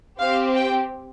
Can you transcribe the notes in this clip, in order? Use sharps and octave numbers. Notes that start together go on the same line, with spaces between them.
C4 G4 F5
G5